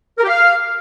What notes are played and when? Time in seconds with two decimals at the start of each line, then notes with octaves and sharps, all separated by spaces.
0.18 A#4
0.23 G4
0.29 F5